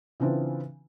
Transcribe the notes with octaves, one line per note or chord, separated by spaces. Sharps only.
C#3 E3 C4 D4 F4 B4